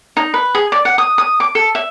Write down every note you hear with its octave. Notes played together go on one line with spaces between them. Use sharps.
D#4
B4
G#4
D5
F#5
D#6
D#6
D6
A4
E5